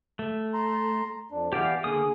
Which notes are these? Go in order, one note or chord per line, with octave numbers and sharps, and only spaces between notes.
A3
A#5 C6
F2 D4
E3 B3 G4 D5 F5
D3 A#3 G#4 D#6